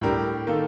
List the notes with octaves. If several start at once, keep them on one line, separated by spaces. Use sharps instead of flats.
A2 G3 D4 G4 A#4
D#3 A#3 F4 A4